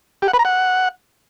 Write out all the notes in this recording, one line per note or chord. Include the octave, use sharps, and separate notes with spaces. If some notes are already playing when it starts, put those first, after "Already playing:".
G4
F#5
B4
A#5
F#5